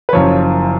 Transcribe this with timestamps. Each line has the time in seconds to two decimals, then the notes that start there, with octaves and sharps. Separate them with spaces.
0.09 B4
0.13 F#1 F#2 F3 C#5